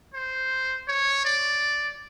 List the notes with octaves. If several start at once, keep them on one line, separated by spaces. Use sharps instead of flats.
C5
C#5
D5